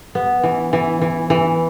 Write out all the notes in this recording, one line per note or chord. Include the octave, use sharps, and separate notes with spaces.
B3
E3
E3
E3
E3